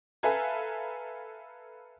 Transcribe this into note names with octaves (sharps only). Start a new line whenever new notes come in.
A4 B4 E5 F5 G#5 A#5